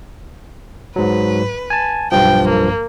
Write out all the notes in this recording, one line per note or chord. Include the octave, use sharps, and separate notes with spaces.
G#2 F#3 B4
G#5 A5
B1 G2 F3 G5
A#3